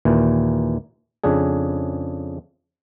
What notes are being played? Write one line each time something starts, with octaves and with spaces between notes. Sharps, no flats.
D#2 A#2 E3
F2 C#3 D4 G#4